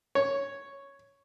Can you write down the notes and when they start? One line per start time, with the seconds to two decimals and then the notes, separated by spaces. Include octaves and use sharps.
0.15 C#5